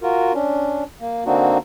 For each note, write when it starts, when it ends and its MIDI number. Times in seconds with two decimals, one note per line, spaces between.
0.01 0.32 65
0.01 0.32 66
0.01 0.32 70
0.33 0.84 61
0.33 0.84 62
1.00 1.25 58
1.26 1.58 50
1.26 1.58 58
1.26 1.58 60
1.26 1.58 62
1.26 1.58 63
1.26 1.58 66